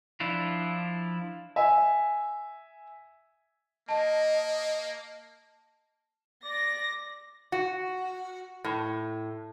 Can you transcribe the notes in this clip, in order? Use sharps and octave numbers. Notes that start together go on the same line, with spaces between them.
F3 D4 E4 F4
E5 G#5
A#3 D#5 A5
D5 A#6
F#4
A2